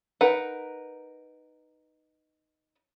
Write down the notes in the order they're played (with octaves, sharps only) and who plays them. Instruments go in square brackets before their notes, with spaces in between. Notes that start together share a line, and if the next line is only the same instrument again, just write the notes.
[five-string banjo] D#4 A#4 B4 F#5